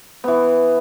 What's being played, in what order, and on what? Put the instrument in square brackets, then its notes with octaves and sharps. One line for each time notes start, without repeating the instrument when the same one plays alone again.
[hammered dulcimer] E3 B3